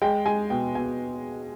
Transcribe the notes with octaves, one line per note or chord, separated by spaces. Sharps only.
G#3 G5
G#3 G#5
B2 G5
B2 G#5